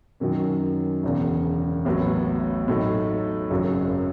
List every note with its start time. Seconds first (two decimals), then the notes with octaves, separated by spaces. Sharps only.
0.20 F#2 D#3 F#3 C#4
1.03 E1 E2 C#3
1.85 A1 A2 F#3 B3
2.68 A2 F#3 A3 D#4
3.50 G#1 F#2 C#3 F#3